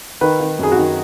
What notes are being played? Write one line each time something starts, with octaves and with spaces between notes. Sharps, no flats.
D#3 B4
D#3
F#2 G#4
F#4
D#3